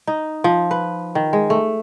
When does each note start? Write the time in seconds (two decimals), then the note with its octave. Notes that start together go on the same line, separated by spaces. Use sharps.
0.07 D#4
0.44 F3
0.71 B4
1.15 D#3
1.33 G#3
1.50 A3